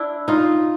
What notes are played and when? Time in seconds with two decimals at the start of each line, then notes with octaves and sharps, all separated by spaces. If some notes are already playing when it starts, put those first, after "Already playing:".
Already playing: D4 E4
0.28 D#4 F4